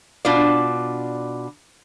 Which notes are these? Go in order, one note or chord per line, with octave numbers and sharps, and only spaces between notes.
B2 D4 F4 D5